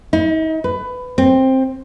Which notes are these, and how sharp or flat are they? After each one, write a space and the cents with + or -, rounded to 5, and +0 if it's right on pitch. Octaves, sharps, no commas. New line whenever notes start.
D#4 +40
B4 +15
C4 +10